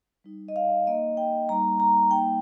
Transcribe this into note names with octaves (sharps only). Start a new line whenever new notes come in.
G3 D#4
D#5
F5
A#3 D#4 D#5
G5
G3 A#3 D#4 A#5
A#5
G3 A#3 D#4 G5